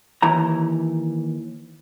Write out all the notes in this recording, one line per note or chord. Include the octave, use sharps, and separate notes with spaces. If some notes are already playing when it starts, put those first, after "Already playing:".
D#2 E3 A#5